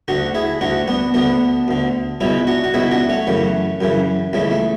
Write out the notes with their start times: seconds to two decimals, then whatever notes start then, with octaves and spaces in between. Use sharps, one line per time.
0.08 D2 D3 D4 F#4
0.35 E4 G#4
0.61 D2 D3 D4 F#4
0.88 B3 D4
1.14 D2 D3 B3 D4
1.68 D2 D3
2.21 C#2 B2 C#4 E4
2.47 D4 F#4
2.64 F#4
2.74 C#2 B2 E4 G#4
2.91 D4 F#4
3.09 A3 C#4
3.27 F#2 C#3 E3
3.81 F#2 C#3 E3
4.33 C#2 C#3 E3 A3
4.51 A3